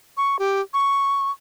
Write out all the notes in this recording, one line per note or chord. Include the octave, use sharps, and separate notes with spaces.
C#6
G4
C#6